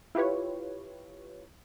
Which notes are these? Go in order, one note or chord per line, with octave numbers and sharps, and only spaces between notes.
E4 F4 G4 B4 C#5